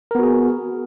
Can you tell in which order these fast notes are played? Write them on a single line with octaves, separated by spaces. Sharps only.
A#4 B3 F#4 G#4